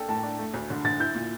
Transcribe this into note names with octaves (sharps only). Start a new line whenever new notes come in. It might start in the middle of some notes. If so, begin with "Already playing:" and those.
Already playing: A#3 D4 A4 G5
A2 A5
D4
A3
D2
D3
D3 A6
E4 G6
A#2